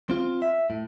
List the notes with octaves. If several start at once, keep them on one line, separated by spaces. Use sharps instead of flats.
C4 F4
E5
A2